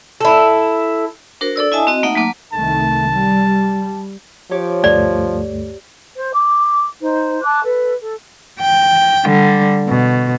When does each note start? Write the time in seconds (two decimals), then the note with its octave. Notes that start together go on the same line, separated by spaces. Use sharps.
0.21 E4 A4
1.41 D4 F#4 A#4 C5
1.56 D4 A4 D5 E6
1.72 E4 D#5 E5 G#5 A5 D#6
1.87 C4 F#4 D#5
2.03 A3 A#3 D#4 E5 F#5
2.15 F#3 A3 A#3 D6
2.53 C2 D#3 A3 A5
3.11 G3
4.51 F3 G4 C#5 D6
4.84 D2 G2 A3 D5
6.15 C5
6.32 D6
7.00 D#4 C5
7.43 A5 D6 F#6
7.63 A4 B4
8.01 A4
8.60 G5
9.26 D3 G3
9.88 B2